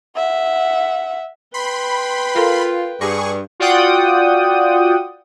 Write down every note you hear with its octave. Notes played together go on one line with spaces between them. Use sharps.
E5 F#5
B4 G5 B5 C6
F4 A4 A#4 A#5
G2 G#4 C#6 A#6
F4 F#4 D5 F#5 G5 D#6